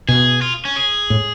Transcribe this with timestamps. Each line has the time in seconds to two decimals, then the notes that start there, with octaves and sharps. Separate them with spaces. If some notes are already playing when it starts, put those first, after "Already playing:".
0.08 B2 G#4
0.42 F4
0.65 C#4
0.76 G#4
1.10 A2